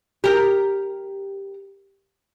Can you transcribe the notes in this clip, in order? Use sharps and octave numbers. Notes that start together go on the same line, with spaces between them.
G4 A#4